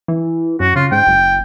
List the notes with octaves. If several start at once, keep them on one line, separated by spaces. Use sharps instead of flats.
E3
F#2 F#4
C#3 F4
G#2 G5
F#1